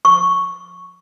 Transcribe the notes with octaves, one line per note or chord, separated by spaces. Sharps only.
C#6